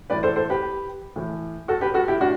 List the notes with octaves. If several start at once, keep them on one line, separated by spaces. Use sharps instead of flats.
A2 E3 B4 D5
A4 C5
A4 C5
G4 B4
A2 E3
F#4 A4
G4 B4
F#4 A4
E4 G4
A2 D4 F#4